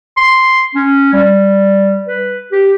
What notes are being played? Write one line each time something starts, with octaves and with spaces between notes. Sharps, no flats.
C6
C#4
G3
B4
G4